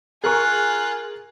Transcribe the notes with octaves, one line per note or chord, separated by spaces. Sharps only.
F4 G#4 A#4 G#5 C#6 F#6